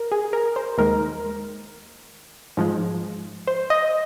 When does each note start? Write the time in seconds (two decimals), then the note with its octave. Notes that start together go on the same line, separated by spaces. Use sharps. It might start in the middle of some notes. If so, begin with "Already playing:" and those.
Already playing: A#4
0.12 G#4
0.33 A#4
0.56 C5
0.78 D#2 D#3 G#3 A#4
2.57 G#2 F3 G#3
3.47 C5
3.70 D#5